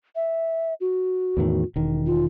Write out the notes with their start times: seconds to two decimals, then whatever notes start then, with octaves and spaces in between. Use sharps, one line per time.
0.16 E5
0.81 F#4
1.37 E2 A2 D#3
1.76 E1 D#3
2.06 F4